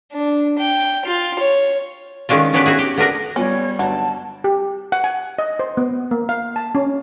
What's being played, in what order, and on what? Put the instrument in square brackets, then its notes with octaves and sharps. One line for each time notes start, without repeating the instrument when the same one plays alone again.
[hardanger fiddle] D4
G5
F4
C#5
[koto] D#3 G#3 C#4 D4 F4
D#3 B3 C#4 D4 G4 B4
E4 F#4 G#4
G4
B3 D4 A#4 F#5
[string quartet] G3 [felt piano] B3 F4 D5 [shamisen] C#4 [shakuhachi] C#5
[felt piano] G1 [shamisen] F#3 [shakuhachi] A5
[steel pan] G4
F#5
G#5
D#5
C5
B3
A#3
F5
A5
C#4